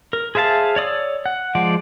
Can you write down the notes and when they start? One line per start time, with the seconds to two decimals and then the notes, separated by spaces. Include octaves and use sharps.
0.13 A#4
0.35 G#4 C5 E5 F5 A5
0.76 C#5 D5 D#6 E6
1.26 F#5
1.55 F3 G#3 D5